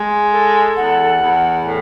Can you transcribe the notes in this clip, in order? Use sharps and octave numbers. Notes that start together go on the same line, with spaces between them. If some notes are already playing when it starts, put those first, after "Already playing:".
Already playing: G#3
A4
E2 F#5
E2
A2